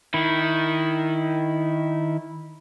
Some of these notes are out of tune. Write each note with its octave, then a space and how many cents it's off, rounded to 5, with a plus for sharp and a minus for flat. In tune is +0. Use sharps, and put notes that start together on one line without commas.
D#3 +0 E4 -10